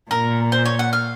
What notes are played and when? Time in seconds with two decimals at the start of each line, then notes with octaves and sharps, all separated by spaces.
0.11 A#2 A#4
0.52 C5
0.66 C#5
0.79 F#5
0.93 F5